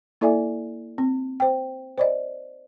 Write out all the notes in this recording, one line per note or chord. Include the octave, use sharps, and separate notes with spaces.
A#3 E4 A4 D5 E5 G#5
C4
C5 G5
C5 D5 D#5